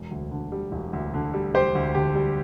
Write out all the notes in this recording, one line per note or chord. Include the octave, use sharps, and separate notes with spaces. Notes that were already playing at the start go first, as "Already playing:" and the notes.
Already playing: E1
D2
D3
G3
E1
D2
D3
G3
E1 G4 C5
D2
D3 G4
G3